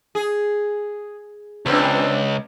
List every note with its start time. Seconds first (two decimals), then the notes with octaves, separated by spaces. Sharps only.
0.15 G#4
1.66 C#2 B3 C4 D4